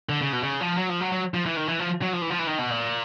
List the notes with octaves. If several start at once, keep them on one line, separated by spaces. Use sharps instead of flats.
D3
C#3
B2
C#3
F3
F#3
F3
F#3
F#3
F3
E3
D#3
E3
F3
F#3
F3
E3
F3
E3
D#3
B2
A#2